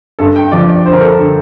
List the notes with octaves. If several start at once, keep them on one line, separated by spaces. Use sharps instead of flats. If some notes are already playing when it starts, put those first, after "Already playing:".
G2 A4
G5
F3 D5
D5
D3 C5
A#4
A4
A#4
D3